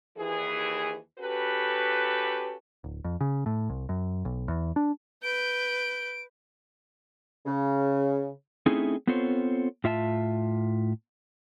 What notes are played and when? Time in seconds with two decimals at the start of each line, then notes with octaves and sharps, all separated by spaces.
0.16 D#2 E3 G#4
1.18 C#4 F#4 G4 A4 B4
2.84 D1
3.04 F2
3.21 C#3
3.46 A2
3.69 C2
3.89 F#2
4.25 B1
4.48 E2
4.76 D4
5.23 B4 G6 D7
7.46 C#3
8.66 A3 C4 C#4 D#4 E4 G#4
9.07 B3 C4 F4 A4 C5 C#5
9.84 A2 F4 E5 F#5 A5